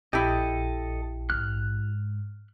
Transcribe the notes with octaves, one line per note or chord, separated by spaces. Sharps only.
A#1 E4 G4 A4 D#5
G#2 F6 F#6